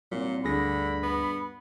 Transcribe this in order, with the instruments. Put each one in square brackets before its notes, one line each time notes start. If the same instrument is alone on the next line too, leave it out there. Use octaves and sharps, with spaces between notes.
[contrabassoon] C2 [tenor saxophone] A#2 [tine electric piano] F#3
[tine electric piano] D2 G#4 A#6 [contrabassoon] G2 [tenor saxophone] D3 [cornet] B5
[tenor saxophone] B3